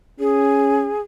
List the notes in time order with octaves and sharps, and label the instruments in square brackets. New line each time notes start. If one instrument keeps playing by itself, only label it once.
[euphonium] C#4 [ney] G#4